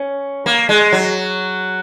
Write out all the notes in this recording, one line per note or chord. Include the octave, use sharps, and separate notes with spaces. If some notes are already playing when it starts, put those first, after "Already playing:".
Already playing: C#4
A#3
G#3
F#3